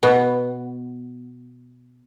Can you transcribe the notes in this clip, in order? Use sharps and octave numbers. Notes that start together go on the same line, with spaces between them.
B2 B3